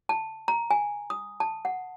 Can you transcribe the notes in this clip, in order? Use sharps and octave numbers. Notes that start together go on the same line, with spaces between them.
A5
A#5
G#5
D#6
A5
F#5